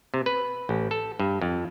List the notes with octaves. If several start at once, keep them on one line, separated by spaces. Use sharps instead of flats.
C3
B4
A1
A4
G2
F2